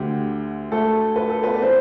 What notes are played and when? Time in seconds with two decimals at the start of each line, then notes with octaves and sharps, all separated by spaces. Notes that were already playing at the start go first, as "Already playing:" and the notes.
Already playing: D2 D3 G4 G5
0.72 A3 A4
1.16 B4
1.30 A4
1.43 B3 B4
1.53 D5
1.62 E3 C4 C5